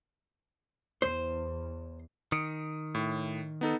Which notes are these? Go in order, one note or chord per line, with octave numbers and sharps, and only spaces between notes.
E2 C5
D#3 D#6 C#7 D7
A2
B3 D#4 A4